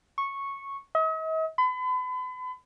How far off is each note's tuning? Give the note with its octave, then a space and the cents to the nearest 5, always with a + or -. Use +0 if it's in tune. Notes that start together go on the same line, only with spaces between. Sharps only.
C#6 -10
D#5 +45
B5 +40